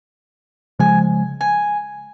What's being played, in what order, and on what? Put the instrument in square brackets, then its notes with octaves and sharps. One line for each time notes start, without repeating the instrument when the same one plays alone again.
[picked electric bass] C#3 F3 G#3 [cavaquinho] G#5
[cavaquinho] G#5